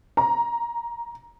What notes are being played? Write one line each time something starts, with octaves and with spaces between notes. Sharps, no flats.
A#5